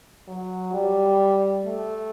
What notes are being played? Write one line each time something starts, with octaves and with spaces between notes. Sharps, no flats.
F#3
G3
A3